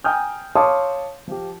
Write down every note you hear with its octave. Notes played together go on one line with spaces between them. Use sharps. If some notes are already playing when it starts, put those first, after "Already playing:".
G5 G#5 A#5 D#6 F6 G6
C#5 F5 A5 C6 D6 D#6
F3 G4